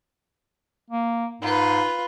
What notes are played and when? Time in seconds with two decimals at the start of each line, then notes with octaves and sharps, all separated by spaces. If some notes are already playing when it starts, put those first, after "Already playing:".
0.90 A#3
1.42 G#2 F4 B4